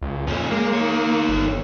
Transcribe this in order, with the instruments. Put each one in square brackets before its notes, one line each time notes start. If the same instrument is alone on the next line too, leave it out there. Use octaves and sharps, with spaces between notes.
[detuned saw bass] C#2
[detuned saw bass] F2 [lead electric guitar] A#2 C#4
[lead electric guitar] G#3 [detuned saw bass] A#3
[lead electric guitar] D#3 C#5
[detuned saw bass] G1